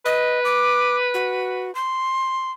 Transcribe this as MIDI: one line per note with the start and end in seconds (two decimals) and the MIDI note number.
0.05 1.70 71
0.05 0.40 75
0.45 0.97 86
1.14 1.74 66
1.75 2.51 84